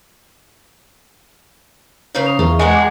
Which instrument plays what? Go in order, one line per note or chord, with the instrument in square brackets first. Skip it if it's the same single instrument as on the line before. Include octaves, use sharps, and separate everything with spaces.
[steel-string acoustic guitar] C#3 A#4 C5
[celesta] A#5 D#6 F7
[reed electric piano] E2 [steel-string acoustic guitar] F4 [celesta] G#4 E5 C#6
[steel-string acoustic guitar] G#4 A#4 F#5 [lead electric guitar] D#5 G#5 [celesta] C#6
[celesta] A5 D6